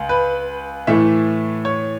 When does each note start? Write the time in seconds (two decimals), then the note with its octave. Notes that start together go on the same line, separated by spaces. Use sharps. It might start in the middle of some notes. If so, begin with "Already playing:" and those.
Already playing: C#2
0.09 B4
0.87 A2 E3 A3 E5
1.65 C#5